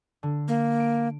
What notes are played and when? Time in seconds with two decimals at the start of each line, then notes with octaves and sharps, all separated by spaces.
0.23 D3
0.48 A#3
0.80 D7